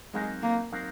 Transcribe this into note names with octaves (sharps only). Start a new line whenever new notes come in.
F#3 G#3 C4 D#4 A#4 F5
A#3
F#3 C4 D#4 A#4 F5